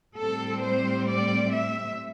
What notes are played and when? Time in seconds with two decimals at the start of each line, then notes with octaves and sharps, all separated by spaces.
0.17 A2 G3 C4 A4
0.62 C5
1.08 D5
1.51 E5